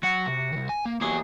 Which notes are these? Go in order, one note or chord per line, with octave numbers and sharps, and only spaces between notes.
F#3 F#4 F#5
C3
C2 D#3
G#5
A#3
E2 F#3 A#3 G4 G#4